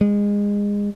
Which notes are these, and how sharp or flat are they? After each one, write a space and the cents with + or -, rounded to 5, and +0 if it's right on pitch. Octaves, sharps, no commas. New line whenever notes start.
G#3 -25